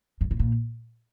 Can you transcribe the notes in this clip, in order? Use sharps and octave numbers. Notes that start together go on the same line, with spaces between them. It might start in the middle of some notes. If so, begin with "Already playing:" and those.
G2
B2
A#2